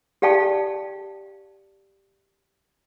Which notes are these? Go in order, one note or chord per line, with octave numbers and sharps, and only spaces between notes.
G4 D5 F5 G5 A5 C#6